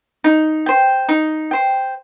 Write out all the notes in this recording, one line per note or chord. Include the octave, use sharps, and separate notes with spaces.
D#4
C5 G5
D#4
C5 G5